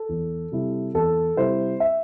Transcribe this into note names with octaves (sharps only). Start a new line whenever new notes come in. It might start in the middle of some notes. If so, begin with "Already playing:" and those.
Already playing: A4
E2
C3 G3 E4
E2 A4
C3 G3 E4 C5
E5